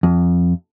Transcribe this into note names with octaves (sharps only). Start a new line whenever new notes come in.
F2